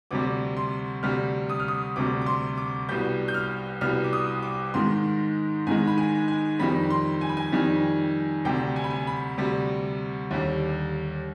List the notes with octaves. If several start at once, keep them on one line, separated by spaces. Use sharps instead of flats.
D2 C3 G3 D6
C6
D2 C3 G3 F6
D#6
F6
D#6
D2 C3 G3 D6
D6
C6
D6
C2 B2 G3 G6
G6
F6
C2 B2 G3 F6
D6
D#6
D6
G#2 D#3 G#3 C6
G#2 D#3 G#3 G#5
B5
G#5
G#5
F2 D#3 G3 B5
C6
G#5
B5
G#5
F2 D#3 G3
D2 C3 G3 G5
G#5
B5
G#5
B5
D2 C3 G3
D#2 D3 G3